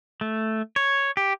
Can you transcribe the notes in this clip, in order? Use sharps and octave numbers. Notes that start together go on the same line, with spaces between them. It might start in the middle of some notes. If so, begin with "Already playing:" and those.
A3
C#5
G4